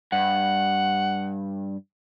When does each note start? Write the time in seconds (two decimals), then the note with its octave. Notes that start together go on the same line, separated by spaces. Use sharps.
0.12 G2 F#5